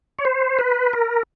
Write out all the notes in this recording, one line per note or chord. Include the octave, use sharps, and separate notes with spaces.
C#5
C5
B4
A#4